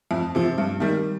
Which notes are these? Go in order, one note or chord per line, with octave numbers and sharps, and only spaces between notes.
F2
C3 F3
G2
D#3 G3